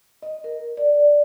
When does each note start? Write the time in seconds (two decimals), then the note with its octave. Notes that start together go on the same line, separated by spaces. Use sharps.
0.23 D#5
0.44 A#4
0.77 D5